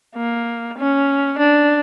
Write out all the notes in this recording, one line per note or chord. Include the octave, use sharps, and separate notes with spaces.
A#3
C#4
D4